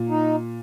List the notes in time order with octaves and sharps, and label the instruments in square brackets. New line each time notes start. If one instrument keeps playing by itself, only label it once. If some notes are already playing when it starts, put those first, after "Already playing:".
Already playing: [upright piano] A#2
[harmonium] D#4